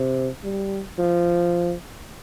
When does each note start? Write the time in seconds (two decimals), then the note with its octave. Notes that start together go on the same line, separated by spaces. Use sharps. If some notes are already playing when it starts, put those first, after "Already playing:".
Already playing: C3
0.44 G3
0.99 F3